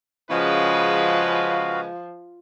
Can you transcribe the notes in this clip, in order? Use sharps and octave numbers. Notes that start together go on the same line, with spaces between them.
C#3 F3 G#3 F#4 B4 F5